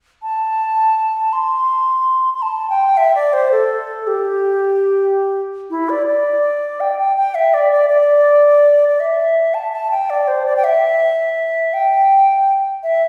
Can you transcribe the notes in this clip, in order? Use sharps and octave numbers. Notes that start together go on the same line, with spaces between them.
A5
C6
C6
A5
G5
E5
D5
C5
A4
G4
E4
D5
D5
G5
G5
G5
E5
D5
D5
D5
D5
E5
A5
A5
G5
D5
C5
D5
G5
E5
G5
E5